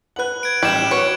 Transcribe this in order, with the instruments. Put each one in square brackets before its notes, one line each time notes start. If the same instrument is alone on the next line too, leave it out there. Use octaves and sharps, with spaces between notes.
[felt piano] B4 F#5 [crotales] F#6 F#7
[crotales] G#6 D7
[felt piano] A1 [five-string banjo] G3 [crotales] F6 E7 F#7
[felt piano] F#4 B4 [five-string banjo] C#5 [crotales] E7